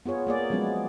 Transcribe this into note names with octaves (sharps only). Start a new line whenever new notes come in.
B3 F4 G#4 C#5
A#3 G#4 D5
F3 F#3 G#3 B3 C#4